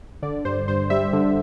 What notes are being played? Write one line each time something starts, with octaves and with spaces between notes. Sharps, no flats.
D3 D5
G2 C5
G2 C5
G3 E5
D3